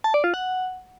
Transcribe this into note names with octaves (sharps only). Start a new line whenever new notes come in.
A5
D5
F4
F#5